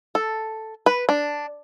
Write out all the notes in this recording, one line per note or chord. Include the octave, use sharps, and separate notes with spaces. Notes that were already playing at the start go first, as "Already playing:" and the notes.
A4
B4
D4